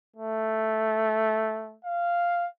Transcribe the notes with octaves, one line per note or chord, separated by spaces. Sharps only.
A3
F5